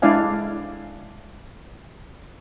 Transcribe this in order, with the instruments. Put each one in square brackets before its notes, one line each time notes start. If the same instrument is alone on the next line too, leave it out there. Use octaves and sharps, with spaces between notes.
[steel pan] G#3 D4 E4 D5 F5 G#5